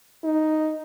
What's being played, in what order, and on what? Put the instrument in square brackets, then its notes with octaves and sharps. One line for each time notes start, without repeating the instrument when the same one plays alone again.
[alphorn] D#4